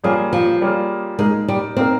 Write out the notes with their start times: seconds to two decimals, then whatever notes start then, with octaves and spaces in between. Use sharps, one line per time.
0.04 F3 G3 A#3 C#4 F4 G#4
0.33 F3
0.61 G3 A#3 C#4 F4 G#4
1.19 G#3 A#3 D#4 A#4
1.48 G3
1.77 A#3 C4 D#4 A#4